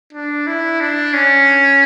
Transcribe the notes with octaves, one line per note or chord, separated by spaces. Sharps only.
D4
E4
D4
C#4